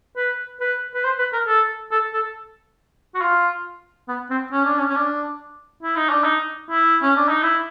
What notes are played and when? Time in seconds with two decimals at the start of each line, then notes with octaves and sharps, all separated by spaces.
0.17 B4
0.60 B4
0.94 B4
1.04 C5
1.19 B4
1.33 A#4
1.47 A4
1.91 A4
2.13 A4
3.15 F#4
3.21 F4
4.08 B3
4.30 C4
4.52 C#4
4.65 D4
4.78 C#4
4.90 C#4
4.96 D4
5.83 E4
5.96 D#4
6.09 D4
6.24 D#4
6.70 E4
7.02 C#4
7.16 D4
7.29 D#4
7.43 E4